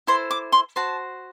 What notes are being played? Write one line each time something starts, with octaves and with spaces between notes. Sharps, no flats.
E4 A4 C5 C6
D6
C6
F#4 C5 A5